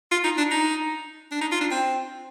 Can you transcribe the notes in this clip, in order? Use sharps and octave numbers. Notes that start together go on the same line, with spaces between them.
F4
D#4
D4
D#4
D4
D#4
F4
D4
C4